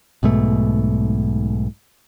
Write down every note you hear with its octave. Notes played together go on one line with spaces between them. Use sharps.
B1 G#2 B2 A3